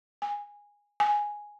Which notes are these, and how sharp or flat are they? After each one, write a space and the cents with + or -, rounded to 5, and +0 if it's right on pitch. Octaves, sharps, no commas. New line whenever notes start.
G#5 -15
G#5 +0